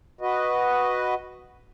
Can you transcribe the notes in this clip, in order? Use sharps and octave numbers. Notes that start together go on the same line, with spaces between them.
F#4 B4 D#5